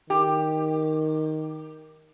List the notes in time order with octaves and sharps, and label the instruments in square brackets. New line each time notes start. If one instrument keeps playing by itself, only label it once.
[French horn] D#3 [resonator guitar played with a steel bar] G4